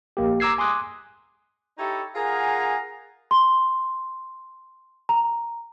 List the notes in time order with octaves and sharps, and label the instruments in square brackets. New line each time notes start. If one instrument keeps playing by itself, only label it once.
[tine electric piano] A#1 A#3 G4
A#5 D6 E6 G#6 C7
G#5 C6 D6 D#6 F#6
[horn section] D#4 E4 G4 A4 C#5 A#5
F4 G#4 A#4 F#5 G#5 A#5
[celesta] C6
A#5